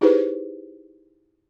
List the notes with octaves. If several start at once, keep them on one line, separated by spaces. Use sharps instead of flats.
D#4 E4 G4 G#4 B4 C5